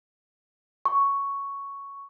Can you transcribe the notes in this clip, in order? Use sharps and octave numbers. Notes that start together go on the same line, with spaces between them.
C#6